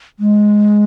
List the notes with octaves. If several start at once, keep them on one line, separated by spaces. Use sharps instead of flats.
G#3